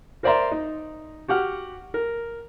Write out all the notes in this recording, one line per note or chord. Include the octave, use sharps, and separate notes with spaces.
A#4 C5 D5 E5 A#5 C6
D#4
F#4 G4 F#5 F6
A#4